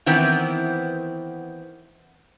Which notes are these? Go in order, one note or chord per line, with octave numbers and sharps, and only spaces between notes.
D#3 E3 B3 C4